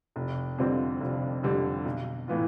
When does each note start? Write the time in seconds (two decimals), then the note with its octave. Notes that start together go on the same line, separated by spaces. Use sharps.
0.16 F1
0.58 F2 D3 G3 C4
1.01 F1
1.43 F2 D3 G3 C4
1.85 B1
2.28 A2 E3 B3 F4